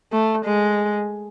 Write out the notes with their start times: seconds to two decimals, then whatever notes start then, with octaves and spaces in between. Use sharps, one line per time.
0.13 A3
0.45 G#3